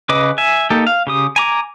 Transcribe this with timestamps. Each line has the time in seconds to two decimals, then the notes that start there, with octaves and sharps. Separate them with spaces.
0.09 C#3 B4 D#5 D6
0.38 E5 G#5
0.70 A#3 D#4 G4 A4
0.87 F5
1.07 C#3 G4 D#6
1.36 G#5 A#5 D6